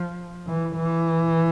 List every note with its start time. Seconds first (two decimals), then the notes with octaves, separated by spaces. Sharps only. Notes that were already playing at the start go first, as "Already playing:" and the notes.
Already playing: F3
0.47 E3
0.75 E3